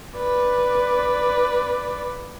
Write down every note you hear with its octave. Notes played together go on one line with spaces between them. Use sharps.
B4 D5